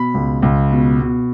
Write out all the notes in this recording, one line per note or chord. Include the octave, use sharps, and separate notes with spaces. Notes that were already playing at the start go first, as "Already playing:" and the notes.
Already playing: B2 B5
C#2
C#2
B2
B2